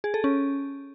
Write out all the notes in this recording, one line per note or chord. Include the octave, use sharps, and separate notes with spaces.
G#4
A4
C#4